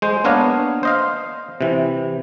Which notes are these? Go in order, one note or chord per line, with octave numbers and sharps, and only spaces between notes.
G#3 C5
A#3 B3 D4 A#4 C#5 F5
C5 D#5 F5
C3 E3